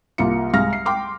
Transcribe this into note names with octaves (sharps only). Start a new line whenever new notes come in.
C2 A#3 F4 C#7
C2 G#3 F5 F6 A#6
C7
G5 C6 D6 F6